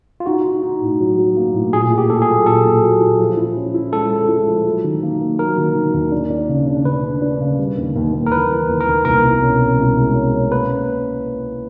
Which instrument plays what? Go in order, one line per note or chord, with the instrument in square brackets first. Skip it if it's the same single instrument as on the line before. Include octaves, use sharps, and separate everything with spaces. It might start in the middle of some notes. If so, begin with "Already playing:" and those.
[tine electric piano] F4
[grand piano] D#4 [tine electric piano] F#4
[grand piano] D#4
D#4
A2
F#3
F#3
A#3
A2
[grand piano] A#2 [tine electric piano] G#4
[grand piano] E4
[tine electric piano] G4
[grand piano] A#2 [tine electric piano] A4
[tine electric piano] G#4
[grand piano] F#3
[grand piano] A#2 [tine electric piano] A4
[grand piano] A#2
F#3
E4
F3
E4
C#4
E4
[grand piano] G#3 [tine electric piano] A4
[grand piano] G#3
E4
F3
F#3
D#3
A#3
A#3
[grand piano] F#3 [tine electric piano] A#4
[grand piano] D#3
D#3
D#2
D4
D4
C#3
D4
[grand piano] C#3 [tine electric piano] B4
[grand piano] D4
D4
C#3
G3
D#2
D#2
D#2
[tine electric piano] A#4
[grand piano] E3 [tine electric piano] B4
[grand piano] E3
D#2
[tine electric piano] A#4
[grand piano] D#2
[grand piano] C2 [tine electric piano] A#4
[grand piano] B2
C#4
C#4
C2
G#3
C#4
C#4
[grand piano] A#3 [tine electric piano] B4